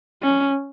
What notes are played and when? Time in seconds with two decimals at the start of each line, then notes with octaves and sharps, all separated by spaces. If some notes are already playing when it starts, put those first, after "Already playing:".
0.22 C#4